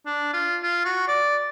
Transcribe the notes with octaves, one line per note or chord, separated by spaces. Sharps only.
D4
F4
F4
F#4
D5